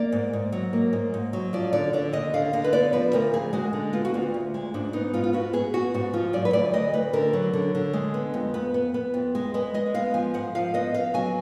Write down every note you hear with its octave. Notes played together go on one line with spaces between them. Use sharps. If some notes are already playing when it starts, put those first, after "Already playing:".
Already playing: A#3 D5
G#2
G#2
F#3
A#3
G#2
G#2
F#3
F3 D5
D3 D5
D3 D5
D#2 D#5
D3 F5
D3 D#5
B4
B3 D5
F3 B4
D2 A#4
D2 G#4
G#3 F#4
D3
B3 F4
F#4
D2 F4
D2
G#3
G#2 D4
B3 D#4
G#2 F4
F4
B3 F#4
B3 G#4
B3 F#4
G#2 F#4
F3 F4
F#3 D5
B4
D2 D5
D2 D#5
D2 B4
D3 A#4
F#3
D3
D3
G#3
B3
F2
B3
B3
B3
F2
G#3
G#3 B4
G#3 D#5
B3 F5
F3 G#5
G#2 F#5
F3 F5
B3 D#5
B3 F5
F#3 G#5